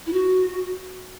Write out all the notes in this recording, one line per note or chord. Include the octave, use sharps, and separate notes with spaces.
E4
F#4